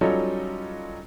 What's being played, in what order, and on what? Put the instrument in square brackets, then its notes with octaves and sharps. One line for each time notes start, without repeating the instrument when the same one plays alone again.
[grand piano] F#3 G3 C#4 D#4 F4 A4